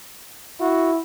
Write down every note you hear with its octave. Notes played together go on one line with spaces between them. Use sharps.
E4 F#4